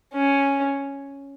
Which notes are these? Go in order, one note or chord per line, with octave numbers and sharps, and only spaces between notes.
C#4